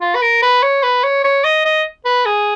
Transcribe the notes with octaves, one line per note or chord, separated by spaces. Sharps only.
F4
B4
A#4
B4
C#5
B4
C#5
C#5
D#5
D#5
B4
G#4